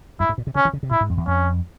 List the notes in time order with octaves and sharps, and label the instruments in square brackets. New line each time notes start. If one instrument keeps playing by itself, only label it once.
[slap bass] G2 [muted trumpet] E4
[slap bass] G#2
A#2
C3
[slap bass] C#3 [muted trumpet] C#4
[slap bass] E3
C#3
C3
[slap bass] A#2 [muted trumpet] E4
[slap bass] G#2
F2
E2
[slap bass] F2 [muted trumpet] C#4